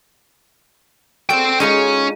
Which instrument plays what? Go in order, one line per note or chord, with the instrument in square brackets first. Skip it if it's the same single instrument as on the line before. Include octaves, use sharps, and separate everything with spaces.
[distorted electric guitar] C4 G5 [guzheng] F#4 A4 D5
[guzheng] G#3 D#4 F4 [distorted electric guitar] C#4